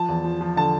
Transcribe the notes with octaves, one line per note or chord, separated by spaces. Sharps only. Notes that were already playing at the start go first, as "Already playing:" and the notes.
Already playing: F3 A5
E2
F3
F3
D3 A5